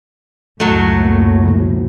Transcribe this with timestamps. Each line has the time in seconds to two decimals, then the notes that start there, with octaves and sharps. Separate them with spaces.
0.60 C#2 F#2 A2 F#3 A3
1.05 A#3
1.45 B2 F3